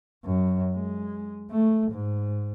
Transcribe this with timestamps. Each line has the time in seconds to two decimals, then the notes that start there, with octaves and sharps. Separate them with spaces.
0.25 F#2
0.74 G#3
1.51 A3
1.91 G#2